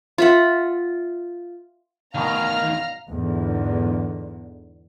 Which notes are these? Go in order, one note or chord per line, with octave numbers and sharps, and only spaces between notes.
F4 E5 F#5
D2 G2 B2 D#3 F5 A#5 F6
E2 G#2 D3